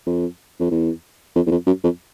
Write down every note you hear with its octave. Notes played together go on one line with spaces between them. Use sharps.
F2
F2
E2
F2
E2
F2
F#2
F2